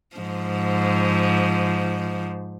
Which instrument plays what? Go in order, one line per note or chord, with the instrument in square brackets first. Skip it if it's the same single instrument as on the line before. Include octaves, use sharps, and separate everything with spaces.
[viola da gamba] G#2 F3